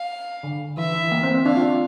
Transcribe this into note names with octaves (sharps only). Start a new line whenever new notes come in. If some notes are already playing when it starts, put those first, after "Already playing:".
Already playing: F5
D3
E3 E5
E3
A#3
C4
C4
D4 F5
F4